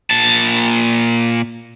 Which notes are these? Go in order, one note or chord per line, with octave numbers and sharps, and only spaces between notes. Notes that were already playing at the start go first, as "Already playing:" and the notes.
A#2 A5